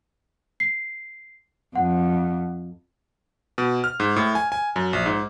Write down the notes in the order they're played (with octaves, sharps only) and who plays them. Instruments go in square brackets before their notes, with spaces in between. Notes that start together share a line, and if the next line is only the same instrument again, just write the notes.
[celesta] C7
[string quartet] F2 [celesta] F#5
[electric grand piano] B2
F6
G#2
A2
G#5
G#5
F#2
A#1
G#2